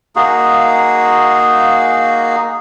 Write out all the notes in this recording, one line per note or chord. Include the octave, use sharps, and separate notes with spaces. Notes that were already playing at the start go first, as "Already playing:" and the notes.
A#3 D#4 F#4 G#4